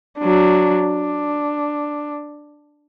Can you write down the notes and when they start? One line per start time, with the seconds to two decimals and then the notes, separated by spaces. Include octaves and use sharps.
0.19 F#3 D4
0.86 D4